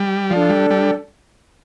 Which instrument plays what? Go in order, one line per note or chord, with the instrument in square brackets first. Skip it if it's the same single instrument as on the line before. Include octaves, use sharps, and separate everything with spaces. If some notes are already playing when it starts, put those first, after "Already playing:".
Already playing: [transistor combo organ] G3
[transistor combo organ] F3 [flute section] D4 A4 D5 A5
[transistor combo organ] G3
G3